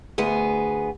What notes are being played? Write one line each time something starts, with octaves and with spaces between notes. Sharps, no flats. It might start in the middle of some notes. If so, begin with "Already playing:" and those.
D2 B3 G#4